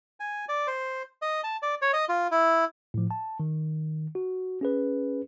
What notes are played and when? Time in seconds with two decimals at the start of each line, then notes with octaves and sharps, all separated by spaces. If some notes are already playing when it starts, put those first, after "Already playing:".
0.20 G#5
0.49 D5
0.67 C5
1.22 D#5
1.44 A5
1.62 D5
1.82 C#5
1.93 D#5
2.09 F4
2.31 E4
2.94 A2 F3
3.11 A5
3.40 D#3
4.15 F#4
4.61 C#4 G#4 B4